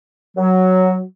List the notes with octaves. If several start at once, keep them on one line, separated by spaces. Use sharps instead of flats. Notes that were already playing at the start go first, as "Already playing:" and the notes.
F#3